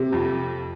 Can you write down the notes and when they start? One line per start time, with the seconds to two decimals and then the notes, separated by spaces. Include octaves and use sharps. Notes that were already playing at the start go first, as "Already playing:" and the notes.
Already playing: C3
0.12 F2